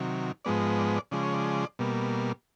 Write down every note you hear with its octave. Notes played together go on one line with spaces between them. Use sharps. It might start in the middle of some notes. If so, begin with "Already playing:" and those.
Already playing: C3 D#3 F#3
G#2 F3 G#3 B3 D5
D#5
D5
D5
C#3 F3 G#3 D5
C#5
D5
B2 G3 A#3